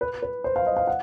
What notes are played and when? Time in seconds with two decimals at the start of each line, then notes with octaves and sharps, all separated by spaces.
0.01 B4
0.22 B4
0.44 C5
0.56 F5
0.66 D#5
0.77 F5
0.87 F#5